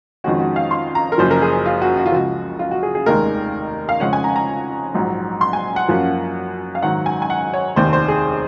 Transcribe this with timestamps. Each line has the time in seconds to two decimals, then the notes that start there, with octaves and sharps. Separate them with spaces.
0.24 F2 D#3 G#3 C#4 F#4
0.40 F#4
0.56 F5
0.71 C6
0.95 A#5
1.12 A#4
1.18 F#1 F#2 F3 C5
1.31 A#4
1.42 G#4
1.66 F4
1.82 F#4
1.97 F#4
2.06 F4
2.12 C#2 C#3 F3 F#4
2.59 F4
2.71 F#4
2.83 G#4
2.95 G#4
3.06 F1 D#2 D#3 G#3 A#4
3.89 F5
4.00 F2 C#3 G#3 C#4 F#5
4.13 G#5
4.24 A#5
4.36 A#5
4.94 A#1 G#2 F#3
5.41 C6
5.53 G#5
5.76 F#5
5.89 F#2 F3 A#3 C#4
6.75 F5
6.82 G#2 D#3 F#3 F#5
7.06 G#5
7.22 G#5
7.30 F#5
7.54 C#5
7.76 F1 D#2 D#3 C5
7.93 C5
8.08 G#4